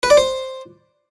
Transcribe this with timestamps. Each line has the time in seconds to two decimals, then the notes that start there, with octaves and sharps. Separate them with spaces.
0.03 B4
0.10 D5
0.17 C5